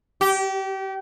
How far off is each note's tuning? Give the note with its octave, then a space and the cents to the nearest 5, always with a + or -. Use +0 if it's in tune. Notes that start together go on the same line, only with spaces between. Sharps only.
G4 -30